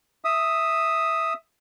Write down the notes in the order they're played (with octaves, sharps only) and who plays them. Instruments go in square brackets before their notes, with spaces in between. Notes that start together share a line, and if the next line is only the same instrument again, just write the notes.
[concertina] E5 D#6